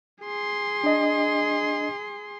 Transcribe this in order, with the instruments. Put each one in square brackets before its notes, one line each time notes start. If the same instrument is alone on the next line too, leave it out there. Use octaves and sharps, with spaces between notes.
[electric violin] G#4 C6
[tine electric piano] D4 D#5